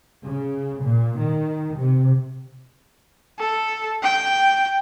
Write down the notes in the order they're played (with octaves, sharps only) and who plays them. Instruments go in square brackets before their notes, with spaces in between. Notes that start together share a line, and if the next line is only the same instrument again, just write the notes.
[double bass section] C#3
A#2
D#3
C3
[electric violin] A4
G5